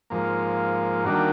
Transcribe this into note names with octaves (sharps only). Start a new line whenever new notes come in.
G#2 F3 A#3
D#3 G3 A#3 D4 F#4